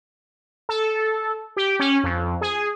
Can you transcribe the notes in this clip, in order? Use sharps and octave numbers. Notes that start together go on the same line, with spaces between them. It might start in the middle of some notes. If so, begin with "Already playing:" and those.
A4
G4
C#4
F2
G#4